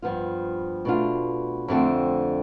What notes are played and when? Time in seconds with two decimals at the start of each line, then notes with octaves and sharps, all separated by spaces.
0.02 G2 F3 B3 F4
0.85 B2 A3 D4 F4
1.68 F2 D3 A3 C4